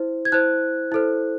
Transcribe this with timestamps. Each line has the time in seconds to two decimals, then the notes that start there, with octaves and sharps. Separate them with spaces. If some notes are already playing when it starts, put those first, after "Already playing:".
Already playing: E4 C5
0.25 G#6
0.32 E4 C5 F#6
0.92 E4 A4 C5